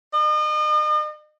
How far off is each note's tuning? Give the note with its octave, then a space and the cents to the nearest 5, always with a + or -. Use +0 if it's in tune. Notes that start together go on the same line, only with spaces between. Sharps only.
D#5 -40